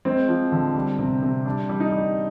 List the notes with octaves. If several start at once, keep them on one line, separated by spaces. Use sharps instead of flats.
G#3 C4
F3
D3
G3
C3
C3
G3 D4
G3
D#4
G3